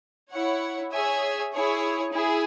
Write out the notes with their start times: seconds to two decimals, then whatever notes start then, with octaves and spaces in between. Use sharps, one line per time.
0.31 E4 C#5 F#5
0.92 G#4 C#5 E5 G#5
1.53 E4 G#4 C#5
2.13 E4 G#4